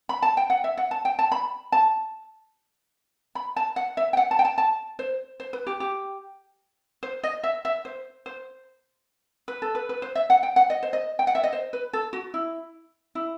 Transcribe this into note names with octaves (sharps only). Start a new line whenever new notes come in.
B5
A5
G5
F#5
E5
F#5
A5
G5
A5
B5
A5
B5
A5
F#5
E5
G5
F#5
A5
G5
A5
A5
C5
C5
B4
G4
G4
C5
D#5
E5
E5
C5
C5
B4
A4
B4
B4
C5
E5
F#5
G5
F#5
D#5
C5
D#5
G5
F#5
E5
D#5
C5
B4
A4
F#4
E4
E4